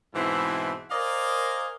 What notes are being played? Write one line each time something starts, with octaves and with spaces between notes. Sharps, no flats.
G#2 B2 E3 C4 E4
A#4 C5 D5 D#5 F5 G#5